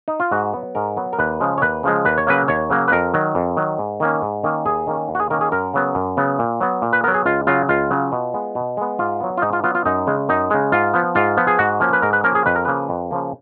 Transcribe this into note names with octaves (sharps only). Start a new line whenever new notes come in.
D#4
F4
G#2 F#4
F#3 B3
G#2 A#4
F#3 B3
A#4
D#2 B4
C#3 F3 G#3
C#5
D#2 B4
C#3 F3 G#3
D#2 B4
C#5
C#3 F#3 A#3 B4
D#2 C#5
C#3 F#3 A#3
B4
F2 A#4
D#3 F#3
F2
D#3 F#3
G#2
D#3 A#3 C#4
G#2
D#3 A#3 C#4
D#2 G#4
D#3 A#3 C#4
D#2
F#4
G#4
D#3 A#3 C#4 A#4
G#4
F#2 A#4
C#3 F#3 B3
F#2
C#3 F#3 B3
A#2
F#3 B3
A#2
B4
F#3 B3 A#4
G#4
C#2 F4
C#3 F#3 F4
C#2 F4
C#3 F#3
B2
G#3 B3
B2
G#3 B3
G#2 F4
F#3 B3
F4
G#2 D#4
F4
F#3 B3 F4
F4
F#2 D#4
C#3 G#3
F#2 D#4
C#3 G#3
G#2 F4
F3 B3
G#2 F4
F3 B3
G#4
G#2 F#4
F3 A#3 C#4
B4
G#2 A#4
B4
F3 A#3 C#4 A#4
G#4
F2 B4
A#4
C#3 F3 A#3 B4
F2
C#3 F3 A#3